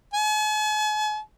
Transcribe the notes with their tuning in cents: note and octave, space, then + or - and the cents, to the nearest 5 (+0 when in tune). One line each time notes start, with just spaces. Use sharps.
G#5 +45